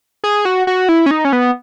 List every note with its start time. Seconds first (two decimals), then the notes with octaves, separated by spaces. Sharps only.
0.24 G#4
0.45 F#4
0.67 F#4
0.89 E4
1.06 C#4
1.11 D#4
1.25 C#4
1.33 B3